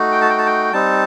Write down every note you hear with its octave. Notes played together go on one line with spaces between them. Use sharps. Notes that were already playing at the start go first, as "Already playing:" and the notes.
Already playing: A3 D#4 F#4
G5
A5
G5
A5
G5
G3 C4 D#4 A5